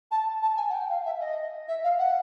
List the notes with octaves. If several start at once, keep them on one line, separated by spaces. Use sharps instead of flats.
A5
A5
G#5
F#5
G5
F5
E5
D#5
E5
F5
F#5